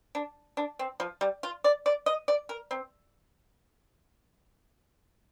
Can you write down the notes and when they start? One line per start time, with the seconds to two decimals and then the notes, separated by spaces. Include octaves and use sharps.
0.15 D4
0.57 D4
0.79 C4
1.00 F3
1.21 G3
1.43 F4
1.64 D5
1.86 D5
2.06 D#5
2.28 D5
2.49 A#4
2.71 C4